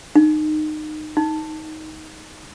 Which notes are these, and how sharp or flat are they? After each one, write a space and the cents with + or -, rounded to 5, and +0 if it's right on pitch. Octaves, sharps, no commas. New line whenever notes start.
D#4 -25
D#4 +10